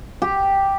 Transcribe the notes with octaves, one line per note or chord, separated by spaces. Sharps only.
G4